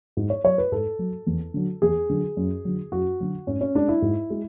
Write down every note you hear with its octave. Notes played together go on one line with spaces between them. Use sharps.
G#2
C#5
F#3 C#5
B4
G#2 A4
F#3
E2
D3 F#3
E2 G#4
D3 F#3
F#2
D3 F#3
F#2 F#4
D3 F#3
G#2 C#4
C#4
G#3 D4
E4
G#2
G#3